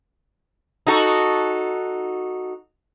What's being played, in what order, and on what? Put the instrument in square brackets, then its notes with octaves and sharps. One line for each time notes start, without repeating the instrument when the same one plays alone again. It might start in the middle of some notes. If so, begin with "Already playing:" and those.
[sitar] D#4 F#4 A4